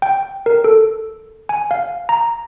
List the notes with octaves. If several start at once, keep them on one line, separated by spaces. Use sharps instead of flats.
G5
A#4
A4
G#5
F5
A#5